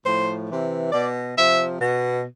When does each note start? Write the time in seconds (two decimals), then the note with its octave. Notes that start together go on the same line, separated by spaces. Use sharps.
0.05 A2 F3 C5
0.49 C3 E3
0.92 B2 D5
1.36 C3 F3 E5
1.80 B2